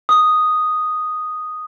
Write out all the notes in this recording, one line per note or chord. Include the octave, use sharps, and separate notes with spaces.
D#6